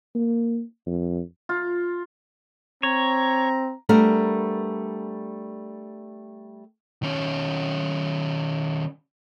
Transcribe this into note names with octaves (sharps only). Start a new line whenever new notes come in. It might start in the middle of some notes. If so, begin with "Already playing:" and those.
A#3
F2
F4
C4 C#5 A#5
G3 A3 B3 D4 A#4
D#3 C#4